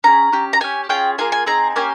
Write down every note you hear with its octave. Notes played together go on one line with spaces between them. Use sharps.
C#4 F4 G#4 A#5
C#4 G4
A#5
C#4 G4 G#5
C#4 F4 G#4 G5
A#3 F4 G#4 G#5
G#5
C4 D#4 G#4 A#5
A#3 C#4 G4 G#5